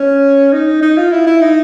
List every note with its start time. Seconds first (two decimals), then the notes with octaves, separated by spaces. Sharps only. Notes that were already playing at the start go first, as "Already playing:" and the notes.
Already playing: C#4
0.53 D#4
0.82 D#4
0.97 F4
1.12 E4
1.27 E4
1.42 D#4